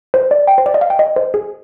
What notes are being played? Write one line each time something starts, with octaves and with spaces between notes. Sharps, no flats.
C5
D5
G5
C5
D5
D#5
F5
G5
D#5
C5
G#4